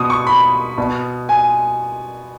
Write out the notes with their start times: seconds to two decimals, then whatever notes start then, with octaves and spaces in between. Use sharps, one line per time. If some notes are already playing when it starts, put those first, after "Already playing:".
Already playing: B2 D#6
0.10 C#6
0.27 B5
0.78 B2
1.29 G#5